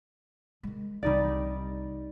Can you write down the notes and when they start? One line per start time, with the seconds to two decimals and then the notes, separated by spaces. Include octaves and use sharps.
0.63 D#3 G#3
1.03 C2 G3 D#4 D5